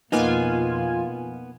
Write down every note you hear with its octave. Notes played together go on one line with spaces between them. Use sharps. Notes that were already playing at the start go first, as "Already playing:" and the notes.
F2 B2 A#3 B3 D#4 F4 G#5